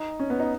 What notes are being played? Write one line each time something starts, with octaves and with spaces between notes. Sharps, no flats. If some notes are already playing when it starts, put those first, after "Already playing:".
Already playing: D#4
C#4
B3
D#4